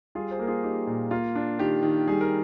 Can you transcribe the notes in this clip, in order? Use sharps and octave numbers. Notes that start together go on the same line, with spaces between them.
G3 F4 G#4
G#4 C5
A#3 A#4
F4 G#4
D#4 G4
A#2
A#3 F4
D4
D#3 G4
D#3
G3 G#4
A#4